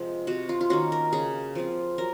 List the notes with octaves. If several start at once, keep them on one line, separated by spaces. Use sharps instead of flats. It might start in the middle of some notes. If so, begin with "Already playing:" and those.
Already playing: C3 F3 G#3
C3 F#4
F4
F4
D#3 A#3 C#4 F#4
A#4
C#3 G#4
F3 C4 F4
F#3 A#4